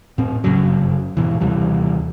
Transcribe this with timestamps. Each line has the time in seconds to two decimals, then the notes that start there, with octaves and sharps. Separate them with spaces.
0.18 A2 C4
0.44 G1 F#2 C#3 F#3
1.17 G#2 B2 E3
1.41 D#2 C3 E3 G3